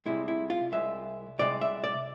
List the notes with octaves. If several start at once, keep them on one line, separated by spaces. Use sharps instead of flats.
C2 C3 G#3 E4
E4
F4
C2 C3 G#3 E5
C2 C3 G#3 D5
E5
D5